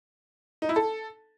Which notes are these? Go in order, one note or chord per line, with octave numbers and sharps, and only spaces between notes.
D#4
E4
A4